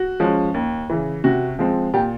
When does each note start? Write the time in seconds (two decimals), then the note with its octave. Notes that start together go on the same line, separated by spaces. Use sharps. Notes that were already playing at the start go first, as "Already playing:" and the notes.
Already playing: F#4
0.20 F3 G#3 C#4
0.54 D#2
0.90 C#3 E3
1.24 C3 F#4
1.59 F3 G#3 C4
1.94 A#2 G4